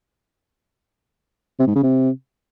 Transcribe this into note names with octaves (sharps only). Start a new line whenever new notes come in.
C3
G#2
C#3
C3